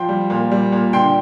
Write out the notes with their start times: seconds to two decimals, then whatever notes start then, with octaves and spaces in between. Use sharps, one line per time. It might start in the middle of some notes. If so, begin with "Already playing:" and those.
Already playing: F3 G5 C6
0.09 G3
0.30 A#2
0.51 G3
0.72 A#2
0.93 D3 G5 C6